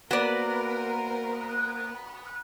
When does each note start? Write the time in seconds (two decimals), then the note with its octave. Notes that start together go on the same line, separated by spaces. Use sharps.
0.11 A#3 B3 F#4 A#4 C5 D5